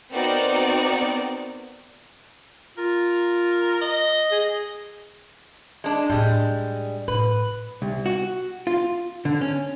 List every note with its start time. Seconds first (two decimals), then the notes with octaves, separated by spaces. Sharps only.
0.13 B3 C4 D#4 F#4 A#4 D5
2.78 F4 A#4
3.81 D#5
4.32 G#4
5.84 G#3 D4
6.10 A2 G3 G#3 D4
7.08 A2 B4
7.82 C2
8.06 F#4
8.67 F4
9.25 D3
9.41 C#4